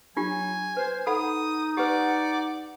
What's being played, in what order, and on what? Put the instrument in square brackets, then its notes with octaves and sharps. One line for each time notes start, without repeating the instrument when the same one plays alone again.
[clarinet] F#3 [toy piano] D4 F4 G4 [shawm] G#5
[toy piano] B4 [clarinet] C5
[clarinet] D#4 [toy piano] A4 F#5 B5 [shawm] D#6
[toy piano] G4 B4 [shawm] D5 [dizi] F#5